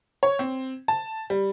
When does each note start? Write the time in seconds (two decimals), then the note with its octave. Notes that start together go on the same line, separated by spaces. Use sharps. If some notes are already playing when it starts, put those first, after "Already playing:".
0.23 C#5
0.39 C4
0.88 A5
1.30 G3